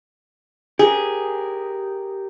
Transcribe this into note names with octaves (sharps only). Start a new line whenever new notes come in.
G4 G#4 A#4